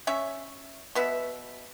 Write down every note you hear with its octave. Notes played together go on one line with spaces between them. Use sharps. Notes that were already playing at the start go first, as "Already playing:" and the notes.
C#4 C#5 E5
B2 B3 E5